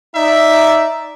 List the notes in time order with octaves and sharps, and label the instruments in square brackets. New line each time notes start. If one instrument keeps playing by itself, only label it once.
[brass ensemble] D#4 D5 E5